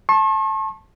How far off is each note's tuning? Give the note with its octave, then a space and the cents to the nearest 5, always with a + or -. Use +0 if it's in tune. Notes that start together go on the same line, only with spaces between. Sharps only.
A5 +0 C#6 -45